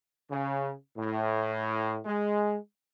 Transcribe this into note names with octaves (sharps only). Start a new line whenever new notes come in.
C#3
A2
G#3